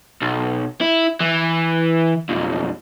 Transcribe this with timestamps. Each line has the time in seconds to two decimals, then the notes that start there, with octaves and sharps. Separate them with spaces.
0.22 B1
0.81 E4
1.21 E3
2.29 B1 F2